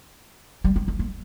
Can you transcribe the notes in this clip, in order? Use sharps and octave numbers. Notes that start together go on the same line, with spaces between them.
G3
G#3
A3
A#3